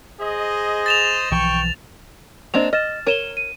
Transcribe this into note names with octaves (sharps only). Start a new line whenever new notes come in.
G#4 C5 D#5
A6 E7 F7
B1 E3 F3 G5 C#6
A#3 C4 D4 C5 D#5 F7
D#5 F6 A6 E7
A#4 C#5 D#7 E7 G7
D#7